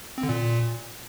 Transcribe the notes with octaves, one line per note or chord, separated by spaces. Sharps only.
C4
D3
A#2